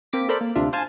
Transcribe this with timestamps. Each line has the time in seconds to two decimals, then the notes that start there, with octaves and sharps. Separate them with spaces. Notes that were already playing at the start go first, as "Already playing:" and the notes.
0.13 A#3 C4 D6 B6
0.29 A4 A#4 C5 D5 B5
0.41 A#3
0.55 D2 C3 D4 F4 E5
0.73 C5 F5 G#5 A5